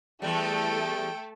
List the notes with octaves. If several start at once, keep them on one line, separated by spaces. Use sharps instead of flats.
E2 G3 A3 A4 G5